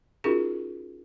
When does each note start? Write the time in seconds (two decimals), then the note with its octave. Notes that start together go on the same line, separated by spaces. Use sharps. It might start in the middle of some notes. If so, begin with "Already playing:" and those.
0.24 C#4 D#4 F4 F#4 G#4 A#4